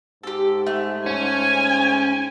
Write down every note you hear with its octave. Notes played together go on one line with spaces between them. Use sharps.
G#2 G4 A4
A3
C#4 G#5